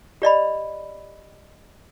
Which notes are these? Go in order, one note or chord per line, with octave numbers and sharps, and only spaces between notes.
G4 D5 D#5 B5